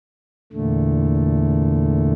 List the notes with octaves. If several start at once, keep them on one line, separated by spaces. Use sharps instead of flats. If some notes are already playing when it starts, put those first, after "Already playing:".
E2 A#2 D3 A3